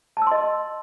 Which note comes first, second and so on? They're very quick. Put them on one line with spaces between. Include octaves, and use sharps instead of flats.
A5 E6 C6 D#5